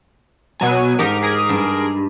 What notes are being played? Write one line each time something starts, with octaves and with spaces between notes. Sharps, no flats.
B2 F#3 G#5
G#2 D#4 G4 A#4
G#4 A#4 D7
G2